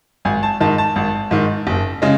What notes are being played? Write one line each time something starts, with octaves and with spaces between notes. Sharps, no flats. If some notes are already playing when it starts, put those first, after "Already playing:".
G#1 G#5
A5
G#2 D#3 A5
A5
G#1
G#2 D#3
F#1
C#3 G#3